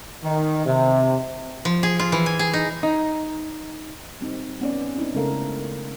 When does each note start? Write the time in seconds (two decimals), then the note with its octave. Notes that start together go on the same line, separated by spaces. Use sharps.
0.24 D#3
0.66 C3
1.65 F3
1.83 G#4
1.99 F4
2.12 E3
2.26 G#5
2.39 G#4
2.53 D#4
2.83 D#4
4.21 G3 C4 D#4
4.61 B3 C#4 D5
4.96 C4 C#4 D#4 E4
5.14 C#3 G#3 A3 A4 A#4 F5